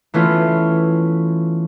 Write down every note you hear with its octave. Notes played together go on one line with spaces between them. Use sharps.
E3 A3 B3 C#4 F4